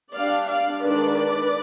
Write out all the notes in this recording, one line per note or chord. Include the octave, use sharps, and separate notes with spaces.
G3 D4 D5 F5
D5 F5
D#3 G#3 D4 B4 D5